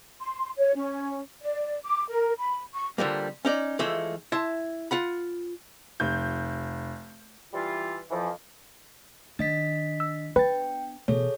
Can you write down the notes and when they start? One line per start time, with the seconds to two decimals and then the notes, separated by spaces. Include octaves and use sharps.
0.20 C6
0.58 C#5
0.75 C#4
1.42 D5
1.84 D6
2.09 A#4
2.38 B5
2.73 C#6
2.98 D3 F3 G3 A#3
3.45 C#4 D#4 D5
3.79 E3 F3 G#3 A3 E5
4.32 E4 E5 A5 C6
4.91 F4 F#5 B5
6.00 F1 G6
7.53 E3 G3 F4
8.10 F2 E3 F3
9.39 D#3 D4 D#5 A6 B6
10.00 E6
10.36 B3 D4 B4 G5 A6
11.08 B2 E3 G#4 A4 C#5